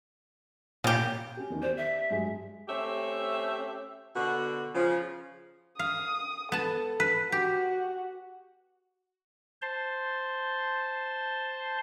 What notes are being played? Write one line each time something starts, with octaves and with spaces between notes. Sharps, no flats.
A#2 C#3 G4
C#4 G4
E2 D#3 C#4
G4 C5 D5
E5
G2 F#3 G#3
A3 C4 C#4 G4 E5
B2 D3 F#4
C#3 F3
F5 D#6
B3 A4 A5
B4
F#4 G4
C5 A5 C6